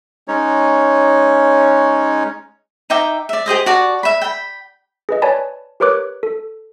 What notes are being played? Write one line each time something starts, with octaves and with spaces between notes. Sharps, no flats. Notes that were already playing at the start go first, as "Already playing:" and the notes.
G#3 C#4 D#4 C#5
D#4 E5 G5 D6
D5 E5
G4 G#4 C5 D#5
F#4 D5 A5
E5 B5
G5 B5
G#4 B4 D#5
B4 C#5 D5 G#5 A5 B5
G4 A#4 B4 C#5 D6 F#6
A4